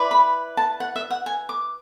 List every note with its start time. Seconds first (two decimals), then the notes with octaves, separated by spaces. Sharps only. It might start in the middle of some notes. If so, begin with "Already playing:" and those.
Already playing: E4 B4 D5
0.11 B5
0.57 A5
0.80 F#5
0.96 E5
1.10 F#5
1.26 G#5
1.49 D6